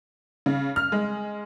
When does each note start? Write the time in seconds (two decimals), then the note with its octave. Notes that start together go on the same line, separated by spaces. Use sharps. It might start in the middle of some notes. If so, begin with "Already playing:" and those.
0.46 C#3
0.76 F6
0.92 G#3